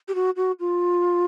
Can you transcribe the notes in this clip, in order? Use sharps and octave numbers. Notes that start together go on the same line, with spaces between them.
G4
F#4
F#4
F4